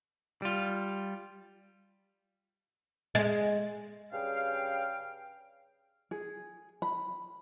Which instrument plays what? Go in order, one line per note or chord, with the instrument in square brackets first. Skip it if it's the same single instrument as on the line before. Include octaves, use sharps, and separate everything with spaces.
[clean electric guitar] G3 F4
[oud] G#3
[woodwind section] G2 C#3 F5 G5
[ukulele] G#4
B5